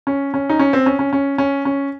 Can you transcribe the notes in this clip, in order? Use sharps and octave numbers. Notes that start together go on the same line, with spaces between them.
C#4
C#4
D#4
C#4
C4
C#4
C#4
C#4
C#4
C#4